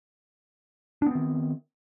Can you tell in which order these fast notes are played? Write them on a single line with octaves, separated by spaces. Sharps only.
D4 B3 C4 D#3